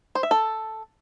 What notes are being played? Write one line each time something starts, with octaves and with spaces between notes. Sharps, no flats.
C5
E5
A4